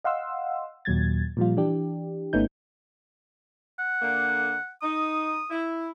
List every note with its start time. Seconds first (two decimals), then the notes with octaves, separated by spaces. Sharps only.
0.04 D#5 F5 F#5 C6 E6
0.85 D#2 A#2 F#3 G#6 A6
1.37 A#2 F3 G3 F4
1.57 E3 D4 G4
2.33 G#1 A3 B3 C#4 D#4 G6
3.79 F#5
4.00 D3 A#3
4.82 D#4 D#6
5.50 E4